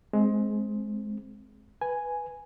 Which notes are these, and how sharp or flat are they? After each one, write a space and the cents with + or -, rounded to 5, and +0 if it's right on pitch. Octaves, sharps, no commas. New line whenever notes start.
G#3 +20 C4 +0
B4 +0 G#5 +0